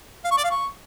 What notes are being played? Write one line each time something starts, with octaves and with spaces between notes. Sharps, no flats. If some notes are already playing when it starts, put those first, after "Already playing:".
F5
C#6
D5
F5
C#6